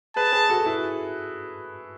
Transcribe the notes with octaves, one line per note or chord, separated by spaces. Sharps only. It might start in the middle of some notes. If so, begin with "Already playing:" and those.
G#4 B4 A5
G#4 B4
F#4 A4
E4 G#4